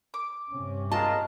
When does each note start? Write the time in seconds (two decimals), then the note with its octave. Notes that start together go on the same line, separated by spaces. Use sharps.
0.14 D6
0.52 G2 C3 C#4
0.91 G#3 F4 A#4 D#5 A5